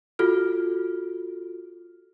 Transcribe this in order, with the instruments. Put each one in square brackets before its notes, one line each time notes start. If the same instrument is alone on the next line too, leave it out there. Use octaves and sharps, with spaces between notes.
[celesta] F4 F#4 A4 F6